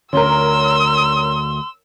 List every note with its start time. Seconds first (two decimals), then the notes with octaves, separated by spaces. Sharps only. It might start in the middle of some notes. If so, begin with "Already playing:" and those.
0.13 D2 D3 C#4 A#4 C6 E6